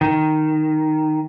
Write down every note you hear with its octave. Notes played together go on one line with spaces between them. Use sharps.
D#3